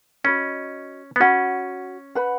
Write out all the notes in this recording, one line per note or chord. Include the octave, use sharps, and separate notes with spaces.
C#4 F#4 D#5 B5
B3
C#4 F#4 C#5 F#5 B5
B4 F#5 B5